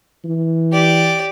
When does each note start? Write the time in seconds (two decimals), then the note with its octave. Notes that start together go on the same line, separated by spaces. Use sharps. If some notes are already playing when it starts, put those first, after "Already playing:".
0.25 E3
0.73 G4 D5